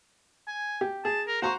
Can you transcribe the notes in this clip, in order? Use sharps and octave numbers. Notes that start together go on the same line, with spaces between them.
G#5
G4
G#4 A5
A#4
F#4 C5 A#5 C#6